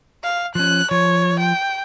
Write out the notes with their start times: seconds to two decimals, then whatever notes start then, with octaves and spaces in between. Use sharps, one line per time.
0.24 F5
0.55 F3 C#4 F#6
0.91 F3 C#5
1.39 G5